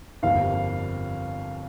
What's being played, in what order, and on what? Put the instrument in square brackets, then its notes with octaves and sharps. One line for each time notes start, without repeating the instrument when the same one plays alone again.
[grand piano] G1 F2 D3 G3 A#3 [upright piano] F5